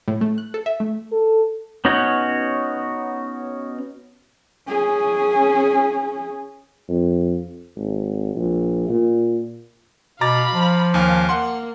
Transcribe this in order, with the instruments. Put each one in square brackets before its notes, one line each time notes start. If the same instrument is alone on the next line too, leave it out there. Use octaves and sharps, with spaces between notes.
[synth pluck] A2
A3
F#6
A4
E5
A3
[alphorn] A4
[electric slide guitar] B3 C#4 D#4 F#4 C#5
[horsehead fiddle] C#4 G#4
[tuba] F2
G#1
A#1
A#2
[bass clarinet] B2 [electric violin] F5 B5 [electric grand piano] A#5 D6 A6
[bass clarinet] F3
[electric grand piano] D#2 G#5 [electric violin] F5
[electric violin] A#3 [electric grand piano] F#5 C6